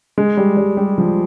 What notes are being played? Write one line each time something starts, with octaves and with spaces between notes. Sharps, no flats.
G#3
G3
G3
G3
F3